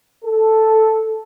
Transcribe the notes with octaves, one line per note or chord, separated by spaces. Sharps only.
A4